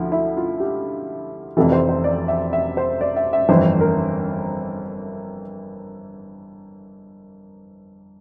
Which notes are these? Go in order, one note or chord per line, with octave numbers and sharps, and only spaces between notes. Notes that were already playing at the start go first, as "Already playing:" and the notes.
Already playing: D2 D3 F3 E4
E4
F4
G4
F1 F2 C3 E3 A4
C5
C5
D5
E5
E5
C5
D5
E5
E5
G1 F2 E3 C5
A#4